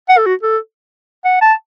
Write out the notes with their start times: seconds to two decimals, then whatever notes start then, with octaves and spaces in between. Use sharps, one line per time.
0.09 F#5
0.18 A4
0.26 F#4
0.43 A4
1.25 F#5
1.41 A5